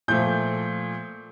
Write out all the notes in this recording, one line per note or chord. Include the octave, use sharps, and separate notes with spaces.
A#2 F3 A3 G6